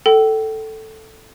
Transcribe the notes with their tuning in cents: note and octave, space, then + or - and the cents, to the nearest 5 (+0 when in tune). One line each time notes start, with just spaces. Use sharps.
A4 +0 G5 -35